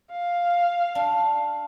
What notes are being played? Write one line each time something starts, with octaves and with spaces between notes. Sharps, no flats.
F5
D4